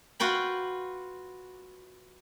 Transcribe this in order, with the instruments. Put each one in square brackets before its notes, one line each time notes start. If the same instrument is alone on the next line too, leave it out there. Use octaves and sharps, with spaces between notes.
[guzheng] F4 F#4 B4 G5 B5